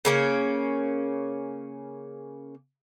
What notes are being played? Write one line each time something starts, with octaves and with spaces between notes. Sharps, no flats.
C#3 A#3 C#4